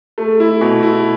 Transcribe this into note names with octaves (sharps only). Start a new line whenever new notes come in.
A3
E4
B2
E4